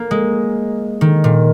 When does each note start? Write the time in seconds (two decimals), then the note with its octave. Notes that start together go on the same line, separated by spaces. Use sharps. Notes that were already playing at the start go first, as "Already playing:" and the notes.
Already playing: A#3
0.11 G#3
1.01 D#3
1.24 A#2